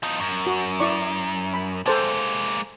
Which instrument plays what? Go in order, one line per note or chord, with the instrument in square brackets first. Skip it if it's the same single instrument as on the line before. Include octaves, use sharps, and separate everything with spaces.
[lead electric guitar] F3 D#4
F#2
[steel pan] F#4
E4 D5 C#6
B5
[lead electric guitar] G#3 A#3 [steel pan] A4 C5 A5